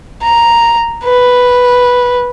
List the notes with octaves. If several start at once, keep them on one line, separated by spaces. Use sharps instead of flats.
A#5
B4